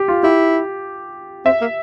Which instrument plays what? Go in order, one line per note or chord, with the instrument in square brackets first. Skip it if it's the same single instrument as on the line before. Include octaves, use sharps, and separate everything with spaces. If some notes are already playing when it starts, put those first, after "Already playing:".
Already playing: [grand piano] G4
F4
[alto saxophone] E4 [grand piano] G4
[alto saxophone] C4 [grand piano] E5
[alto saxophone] A#3